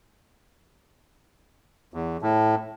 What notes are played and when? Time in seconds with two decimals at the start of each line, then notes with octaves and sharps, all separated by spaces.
1.94 E2
2.22 A2